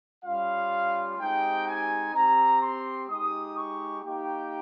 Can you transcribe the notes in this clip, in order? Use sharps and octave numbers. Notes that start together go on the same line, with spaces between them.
G3 C#4 F4 F5
G#3 C4 D#4 G4 G5
G#5
C4 G4 A#5
C6
G#3 D#4 G4 D#6
C#6
A#3 D#4 G4 G5